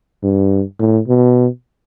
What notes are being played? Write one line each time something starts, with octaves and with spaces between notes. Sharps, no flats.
G2
A2
B2